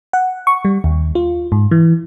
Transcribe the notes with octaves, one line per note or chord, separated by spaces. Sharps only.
F#5
C#6
G3
D#2
F4
G#2
E3